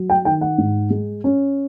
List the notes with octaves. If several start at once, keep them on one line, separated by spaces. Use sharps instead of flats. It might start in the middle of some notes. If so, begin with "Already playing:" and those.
Already playing: F#3
G5
D#3 G5
F#5
G#2
G#3
C#4